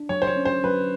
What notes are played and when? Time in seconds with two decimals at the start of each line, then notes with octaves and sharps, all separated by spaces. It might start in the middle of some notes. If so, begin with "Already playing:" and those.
Already playing: D4
0.09 F#3 C#5
0.22 C5
0.27 C#5
0.36 C#4
0.45 C5
0.64 F#3 B4